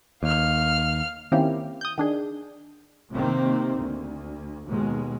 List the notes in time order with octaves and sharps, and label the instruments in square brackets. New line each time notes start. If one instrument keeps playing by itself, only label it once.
[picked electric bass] D#2 [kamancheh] F5 F6
[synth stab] D#3 A#3 C4 C#4 E4 G4
D#6 G6
D#3 D4 G#4
[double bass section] C3 D#3 A#3 C4
D2
D#2 B2 G#3